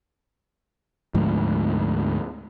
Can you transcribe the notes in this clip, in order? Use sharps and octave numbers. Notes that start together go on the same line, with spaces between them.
D2 G#2 F3